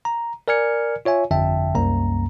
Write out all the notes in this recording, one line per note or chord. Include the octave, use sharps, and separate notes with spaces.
A#5
A#4 D5 G#5 F6 G#6 C#7
F4 C#5 E5 G#5
G1 F2 D3 E5 G5 A5
C2 F#2 A#3 A#5